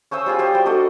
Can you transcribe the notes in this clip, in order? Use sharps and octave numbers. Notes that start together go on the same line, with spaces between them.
C#4 C5 D#6 E6
G3 F4 G#4
G4 C5 D#6
G3 G5
D4 F#4 A4 D#5